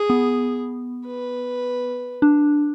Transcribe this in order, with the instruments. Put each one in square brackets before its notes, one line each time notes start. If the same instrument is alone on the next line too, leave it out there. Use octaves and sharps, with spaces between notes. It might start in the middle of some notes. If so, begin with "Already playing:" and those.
Already playing: [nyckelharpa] G#4
[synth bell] B3
[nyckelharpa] B4
[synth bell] D4